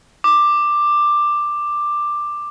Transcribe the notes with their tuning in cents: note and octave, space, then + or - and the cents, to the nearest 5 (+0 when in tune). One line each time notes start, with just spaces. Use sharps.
D6 +10